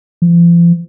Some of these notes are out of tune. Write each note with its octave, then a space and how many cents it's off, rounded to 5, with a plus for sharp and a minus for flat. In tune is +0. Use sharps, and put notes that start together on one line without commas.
F3 -40